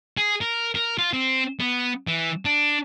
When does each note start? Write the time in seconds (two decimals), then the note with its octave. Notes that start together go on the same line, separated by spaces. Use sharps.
0.17 G#4
0.41 A#4
0.75 A#4
0.98 F4
1.13 C4
1.60 B3
2.07 E3
2.45 D4